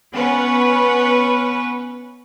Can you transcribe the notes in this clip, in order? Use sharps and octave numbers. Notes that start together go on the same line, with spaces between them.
B3 C#4 B4